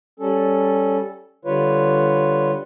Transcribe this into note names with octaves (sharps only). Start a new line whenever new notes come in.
G3 C#4 A4
D3 G3 F4 B4 C#5